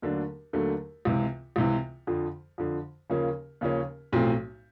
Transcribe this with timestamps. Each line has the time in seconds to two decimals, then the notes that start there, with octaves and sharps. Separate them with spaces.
0.02 D#2 D3 F#3 A3 D4
0.53 D#2 D3 F#3 A3 D4
1.05 C#2 C3 E3
1.56 C#2 C3 E3
2.07 F2 D3 F3
2.58 F2 D3 F3
3.10 D#2 C#3 F3 A#3 C#4
3.61 D#2 C#3 F3 A#3 C#4
4.13 B1 A2 F3 A3 C4